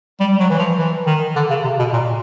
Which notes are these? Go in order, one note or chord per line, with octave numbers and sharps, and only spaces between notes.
G3
G3
F#3
E3
F3
E3
D#3
D3
C#3
C3
B2
A#2